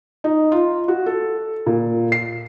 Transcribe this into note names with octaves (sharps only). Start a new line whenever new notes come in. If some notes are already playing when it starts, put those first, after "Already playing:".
D#4
F4
F#4
A4
A#2
C7